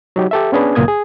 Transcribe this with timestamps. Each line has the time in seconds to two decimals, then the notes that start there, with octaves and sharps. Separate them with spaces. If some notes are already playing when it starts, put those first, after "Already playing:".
0.16 F#3 D#4 G4
0.31 G4 A4 E5
0.52 B3 C#4 D4 G#4 B4
0.75 C#2 F#2 A#2 A#3 D#6 G#6
0.88 G#4